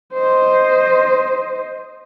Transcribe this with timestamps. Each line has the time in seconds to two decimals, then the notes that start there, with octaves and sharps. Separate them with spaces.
0.14 C5 D#5